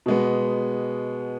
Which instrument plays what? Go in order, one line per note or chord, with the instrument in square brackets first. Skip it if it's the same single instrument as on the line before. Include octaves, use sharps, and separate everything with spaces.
[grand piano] B2 G#3 B3